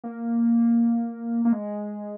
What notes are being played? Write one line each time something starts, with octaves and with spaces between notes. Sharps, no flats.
A#3
A#3
G#3